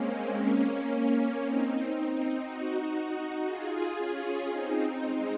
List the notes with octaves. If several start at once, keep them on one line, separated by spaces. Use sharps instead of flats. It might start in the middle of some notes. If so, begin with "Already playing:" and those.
Already playing: G#3 A#3 C4 C#4
A#3 C#4
C4 D#4
D#4 F#4
F4 G#4
C#4 F4
C4 D#4
G#3 C4